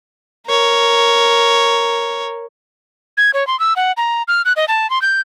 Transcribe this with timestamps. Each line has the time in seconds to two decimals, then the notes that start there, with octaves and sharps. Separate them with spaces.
0.47 A#4 C#5
3.17 G#6
3.34 C#5
3.47 C6
3.59 E6
3.76 F#5
3.97 A#5
4.28 F6
4.45 F#6
4.56 D#5
4.68 A5
4.90 C6
5.02 G6